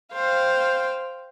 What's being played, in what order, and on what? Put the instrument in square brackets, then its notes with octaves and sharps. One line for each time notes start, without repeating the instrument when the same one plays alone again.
[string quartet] C5 F5 G5